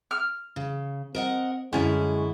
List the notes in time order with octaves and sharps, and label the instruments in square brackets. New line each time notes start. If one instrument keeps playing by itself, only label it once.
[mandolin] F6
[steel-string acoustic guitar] C#3
[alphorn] C4 [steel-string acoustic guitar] A#4 D#5 F#5
[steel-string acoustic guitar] F#2 D3 E4 [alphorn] G#3 [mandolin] C#4